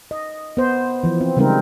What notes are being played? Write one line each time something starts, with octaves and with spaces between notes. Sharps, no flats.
D#5
B3 C5
E3 F3
C4
C#3 G3 G#3 C4 D#4 A#4